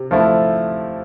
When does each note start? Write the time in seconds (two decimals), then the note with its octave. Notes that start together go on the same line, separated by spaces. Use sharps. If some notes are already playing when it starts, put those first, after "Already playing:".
Already playing: C3
0.11 F3 A3 E4